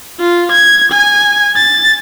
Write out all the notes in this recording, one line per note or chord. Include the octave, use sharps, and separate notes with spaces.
F4
G#6
G#5
A6